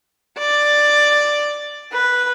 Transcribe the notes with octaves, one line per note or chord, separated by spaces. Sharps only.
D5
B4